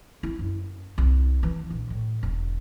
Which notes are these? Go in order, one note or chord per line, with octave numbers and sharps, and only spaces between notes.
E4
F#2
C2
E3
A#1
A2
E1